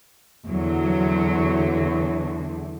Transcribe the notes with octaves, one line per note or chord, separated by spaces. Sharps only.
E2 D3 F#3